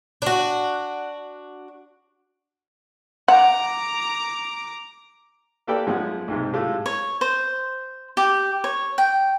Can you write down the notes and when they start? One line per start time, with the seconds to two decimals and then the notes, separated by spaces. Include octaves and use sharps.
0.22 D4 F#4
3.28 F#5 A#5 D6
5.67 A#3 G4 A4 B4 D5 G5
5.87 F#2 F3 G#3 B3 F#5
6.28 B1 G#2 C3
6.53 A2 G#3 A3 F4 G4
6.86 C#5
7.21 C5
8.17 G4
8.64 C#5
8.98 G5